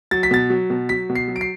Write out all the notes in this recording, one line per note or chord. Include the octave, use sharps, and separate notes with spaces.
F#3 A6
B6
B2 A6
F#3
B2
F#3 B6
B2
C7
F#3
D7
C7